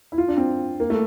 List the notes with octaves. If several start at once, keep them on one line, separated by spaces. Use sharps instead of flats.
E4
F4
D4
C4
A#3
A3